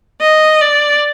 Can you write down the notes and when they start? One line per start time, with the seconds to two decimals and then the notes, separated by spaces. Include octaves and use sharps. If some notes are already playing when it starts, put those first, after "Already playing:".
0.21 D#5
0.61 D5